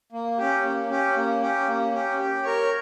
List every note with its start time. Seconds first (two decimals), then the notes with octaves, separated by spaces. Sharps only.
0.12 A#3
0.38 C#4 G4
0.64 A#3
0.90 C#4 G4
1.15 A#3
1.41 C#4 G4
1.67 A#3
1.93 C#4 G4
2.19 G4
2.44 A#4 C#5